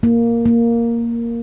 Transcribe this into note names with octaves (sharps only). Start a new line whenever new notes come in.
A#3
A#3